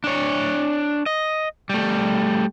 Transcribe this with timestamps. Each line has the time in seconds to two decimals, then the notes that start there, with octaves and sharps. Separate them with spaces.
0.04 D4 C#5
1.06 D#5
1.70 G3 A3